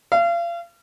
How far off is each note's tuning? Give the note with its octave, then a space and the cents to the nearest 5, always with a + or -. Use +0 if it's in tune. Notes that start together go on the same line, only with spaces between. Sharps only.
F5 -35